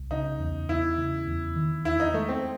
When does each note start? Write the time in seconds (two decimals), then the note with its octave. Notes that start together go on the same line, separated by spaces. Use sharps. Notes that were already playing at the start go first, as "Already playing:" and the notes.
Already playing: C2
0.11 C#3 D#4
0.40 E2
0.69 E2 E4
0.98 C#3
1.27 E2
1.56 D#3
1.85 E2 E4
2.00 D#4
2.14 G#3 A3
2.29 C4